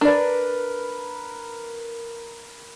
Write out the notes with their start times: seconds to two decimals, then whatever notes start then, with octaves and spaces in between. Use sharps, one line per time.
0.01 D4 A#4 B4 D5